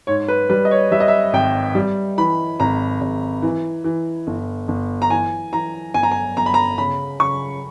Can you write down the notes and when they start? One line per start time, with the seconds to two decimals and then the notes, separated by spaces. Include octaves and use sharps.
0.07 G#2 C#5
0.28 B4
0.49 G3 B4
0.65 D#5
0.71 C#5
0.91 G3 E5
1.00 D#5
1.08 E5
1.33 G#1 G5
1.75 G3
2.18 E3 B5
2.60 G#1 A#5
3.01 G#1
3.42 E3
3.84 E3
4.27 G1
4.68 G1
5.02 A#5
5.10 E3 G#5
5.53 E3 A#5
5.94 G1 G#5
6.03 A#5
6.11 G#5
6.37 G1 A#5
6.46 B5
6.54 A#5
6.78 C#3 B5
7.20 C#3 C#6